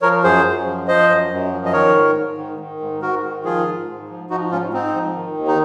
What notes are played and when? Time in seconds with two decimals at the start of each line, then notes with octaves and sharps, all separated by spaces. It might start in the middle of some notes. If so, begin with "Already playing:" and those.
0.02 F3 A#4 C#5
0.24 F#2 G#4 C5
0.45 F#2
0.66 F3
0.88 F3 C5 D#5
1.09 F#2
1.31 F#2
1.52 F3
1.66 D#5
1.73 D#3 A#4 C#5
1.95 G#2
2.16 G#2
2.37 D#3
2.59 D#3
2.80 G#2
3.02 G#2 F#4 A#4
3.24 D#3
3.45 F3 F4 G#4
3.67 G#2
3.87 G#2
4.09 F3
4.30 F3 D#4 F#4
4.51 G#2 C#4 F4
4.73 G#2 C4 D#4
4.94 F3
5.15 D#3
5.38 D#2
5.48 D#4